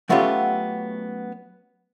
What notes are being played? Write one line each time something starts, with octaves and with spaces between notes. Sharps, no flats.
F#3 A3 B3 C#4 F4 G4